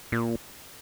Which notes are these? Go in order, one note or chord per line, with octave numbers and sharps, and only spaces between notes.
A#2